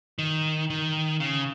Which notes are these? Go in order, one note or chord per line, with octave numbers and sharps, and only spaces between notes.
D#3
D#3
C#3